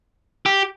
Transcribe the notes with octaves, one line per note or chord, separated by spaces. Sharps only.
G4